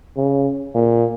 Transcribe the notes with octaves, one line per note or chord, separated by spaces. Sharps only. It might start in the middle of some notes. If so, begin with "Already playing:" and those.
C#3
A#2